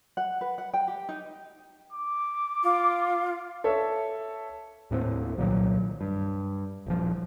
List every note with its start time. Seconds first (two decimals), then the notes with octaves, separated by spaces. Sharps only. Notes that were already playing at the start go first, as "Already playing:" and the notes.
0.17 F#5
0.41 B4
0.58 F#5
0.74 G5
0.88 G4
1.09 D#4
1.93 D6
2.63 F4
3.64 A4 C#5 E5
4.91 D#2 A2 A#3 C4
5.37 C2 A#2 D#3 F#3
6.01 G2
6.86 D#1 F3